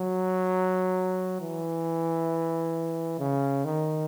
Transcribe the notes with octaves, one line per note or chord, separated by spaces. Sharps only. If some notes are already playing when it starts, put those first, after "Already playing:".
Already playing: F#3
E3
C#3
D#3